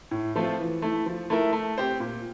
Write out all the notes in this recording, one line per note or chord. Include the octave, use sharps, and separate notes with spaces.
A2
F3 A3 C4 F4
E3
A3 E4
F3
A3 E4 A#4 E5
A3
C4 G4 C5
A#2